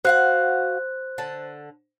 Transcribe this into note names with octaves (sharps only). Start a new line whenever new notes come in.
F#4 C5 F5 F#5 F#6
D3 A5